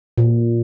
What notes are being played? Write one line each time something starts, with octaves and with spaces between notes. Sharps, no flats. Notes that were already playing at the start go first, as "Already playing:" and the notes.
A#2